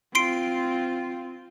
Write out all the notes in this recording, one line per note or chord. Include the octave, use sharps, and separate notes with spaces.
C4 F4 C6 C7 D7